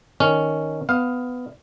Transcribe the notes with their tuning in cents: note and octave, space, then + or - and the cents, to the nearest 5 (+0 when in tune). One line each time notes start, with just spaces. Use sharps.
D#3 +0 C#4 +0
B3 +15 F5 +15